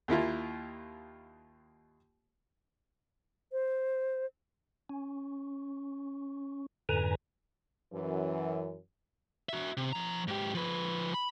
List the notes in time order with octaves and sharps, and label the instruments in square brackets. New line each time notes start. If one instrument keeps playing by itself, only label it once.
[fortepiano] D#2 A#3 E4 F4
[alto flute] C5
[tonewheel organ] C#4
F2 G#2 D3 B4 G#5 A#5
[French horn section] F#2 E3
[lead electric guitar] F#4 E5
C3
F3 A#5
G#2 G4
F3 B4
B5